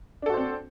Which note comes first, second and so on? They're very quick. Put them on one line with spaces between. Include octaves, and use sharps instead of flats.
D4 A4 F#4 C5 C4